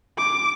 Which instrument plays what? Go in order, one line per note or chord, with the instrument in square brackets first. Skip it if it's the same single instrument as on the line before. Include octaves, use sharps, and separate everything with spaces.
[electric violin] D6